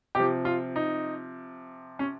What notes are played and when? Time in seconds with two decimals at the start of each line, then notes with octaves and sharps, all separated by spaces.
0.15 C3 F3 G4
0.45 F4
0.76 D#4
1.99 C#4